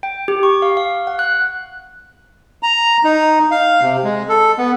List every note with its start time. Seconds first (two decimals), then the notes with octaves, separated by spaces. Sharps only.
0.03 G5
0.28 G4
0.43 C#6
0.62 F5
0.77 F5
1.07 F#5
1.19 F#6
2.63 A#5
3.04 D#4
3.51 F5
3.82 C3
4.04 G#3
4.29 A4
4.58 B3